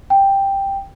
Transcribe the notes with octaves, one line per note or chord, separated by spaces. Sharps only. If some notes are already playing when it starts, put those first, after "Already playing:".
G5